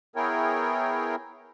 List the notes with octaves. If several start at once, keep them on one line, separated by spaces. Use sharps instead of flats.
B3 E4 G#4 A#4 C#5 G5